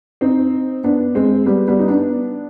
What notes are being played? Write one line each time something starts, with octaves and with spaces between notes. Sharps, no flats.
C4 D#4
B3 D4
G#3 C4
G3 B3
G3 B3
D#4
B3 D4